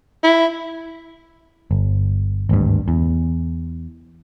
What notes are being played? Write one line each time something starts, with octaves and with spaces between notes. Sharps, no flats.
E4
G1
G#1 D2 G2
E2